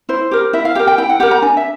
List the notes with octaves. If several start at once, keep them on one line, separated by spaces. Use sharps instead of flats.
E4 C5
G4 A#4
E4 E5
F5
G4 A#4 G5
G5
E4 G5
F#5
G4 A#4 F#5
A#5
D4 G#5
E5